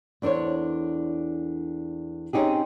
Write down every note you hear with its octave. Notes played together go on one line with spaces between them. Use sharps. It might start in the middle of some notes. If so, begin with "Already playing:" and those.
E2 D4 A4 C5 C#5
C4 C#4 D#4 G4 G#4